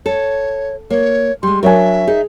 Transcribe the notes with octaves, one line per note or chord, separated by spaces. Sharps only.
A4 C#5
A#3 C#5
G3 G#3 C6
F#3 D4 A#4 C#5 E5 G#5
D#4 G#4